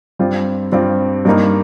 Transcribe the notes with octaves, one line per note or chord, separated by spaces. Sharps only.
G2 G3 C4 F4
G2 G3 C4 F4
G2 G3 A#3 D#4